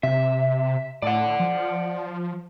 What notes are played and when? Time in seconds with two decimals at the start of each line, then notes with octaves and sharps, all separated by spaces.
0.03 C3 E5
1.02 A2 D5 F#5
1.40 F3